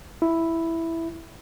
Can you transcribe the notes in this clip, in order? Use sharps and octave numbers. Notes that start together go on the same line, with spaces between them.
E4